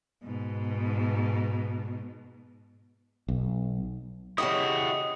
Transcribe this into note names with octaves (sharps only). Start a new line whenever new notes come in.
G#2 B2
B1
C#3 E4 F#4 G4 D#5 D#6